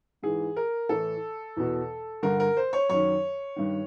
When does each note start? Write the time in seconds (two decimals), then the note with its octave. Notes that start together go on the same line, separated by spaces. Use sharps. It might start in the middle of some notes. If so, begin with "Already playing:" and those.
0.23 G#2 E3 G#4
0.56 A#4
0.89 A2 E3 A4
1.57 E2 B2
2.23 G2 D3 A#4
2.40 A#4
2.57 C5
2.73 C#5
2.89 F#2 D#3 C#5
3.56 G2 D#3